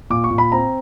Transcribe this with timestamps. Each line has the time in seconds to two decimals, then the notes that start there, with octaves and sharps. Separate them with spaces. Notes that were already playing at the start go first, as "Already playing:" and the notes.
0.10 A#2 D6
0.24 C#6
0.31 A#2
0.38 B5
0.52 C4 A#5